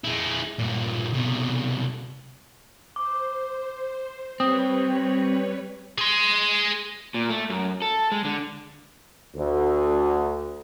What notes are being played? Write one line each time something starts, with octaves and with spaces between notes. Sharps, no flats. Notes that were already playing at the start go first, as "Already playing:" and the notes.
G#3 E4
G2 A#2
C2 B2
C5 D6
G3 C4 B4 C#5 D#6
G#4 C6
A#2
A3
F#2
A4
G#3
D3
D2